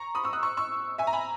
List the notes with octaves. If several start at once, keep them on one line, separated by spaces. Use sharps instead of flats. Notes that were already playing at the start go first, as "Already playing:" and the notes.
Already playing: A#5 C#6
B5 D#6
C#6 E6
D#6 F#6
C#6 E6
C#6 E6
E5 G#5
A#5
G#5 B5